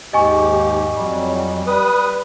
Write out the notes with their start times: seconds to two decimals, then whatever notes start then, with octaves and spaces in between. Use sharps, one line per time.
0.13 D#2 G#2 G4 D#5 G#5 C#6
0.95 F2 F#3 G3
1.67 G3 B4 D#6